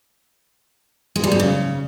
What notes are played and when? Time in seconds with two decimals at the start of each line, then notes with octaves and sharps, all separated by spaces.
1.16 G#3
1.24 G3
1.32 G#2
1.40 C#3